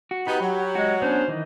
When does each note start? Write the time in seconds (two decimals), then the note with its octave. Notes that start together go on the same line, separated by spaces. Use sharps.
0.11 F#4
0.27 B3 D#4 G4 B5
0.40 F#3
0.75 G#3 F#4
1.02 B3 C#4 D4 C5
1.28 D#3 E3 D#4